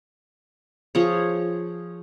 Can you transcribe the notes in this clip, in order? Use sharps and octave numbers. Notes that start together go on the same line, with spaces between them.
F3 G#4 C#5